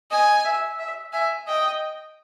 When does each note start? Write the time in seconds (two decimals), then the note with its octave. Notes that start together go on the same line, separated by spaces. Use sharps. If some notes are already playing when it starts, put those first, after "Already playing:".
0.11 D#5 G#5
0.45 E5
0.79 E5
1.13 E5 G#5
1.48 D#5 G5